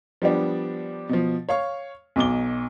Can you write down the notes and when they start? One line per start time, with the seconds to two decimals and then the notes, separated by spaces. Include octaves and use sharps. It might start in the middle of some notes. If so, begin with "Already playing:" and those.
0.22 F3 G3 B3 D4
1.09 B2 F3
1.49 C#5 F5 C#6
2.16 B1 B2 D6 G7